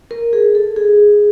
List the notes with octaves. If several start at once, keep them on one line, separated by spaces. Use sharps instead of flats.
A#4
G#4
A4
G#4